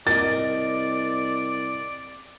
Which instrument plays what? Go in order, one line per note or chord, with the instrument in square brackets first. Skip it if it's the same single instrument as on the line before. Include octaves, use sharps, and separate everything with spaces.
[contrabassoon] C2 [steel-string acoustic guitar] A#4 D#5 [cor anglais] D5 [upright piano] A6